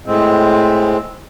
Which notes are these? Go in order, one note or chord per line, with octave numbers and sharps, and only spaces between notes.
A2 G#3 C4